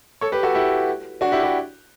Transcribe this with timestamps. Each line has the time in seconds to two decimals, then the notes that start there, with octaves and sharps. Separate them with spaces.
0.21 A4 C#5
0.32 G4 B4
0.43 F#4 A4
0.55 E4 G4
1.21 D4 F#4
1.32 E4 G4
1.43 E4 G4